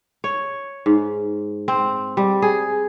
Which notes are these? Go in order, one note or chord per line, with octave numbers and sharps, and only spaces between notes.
C#5
G#2
C4
G3
G#4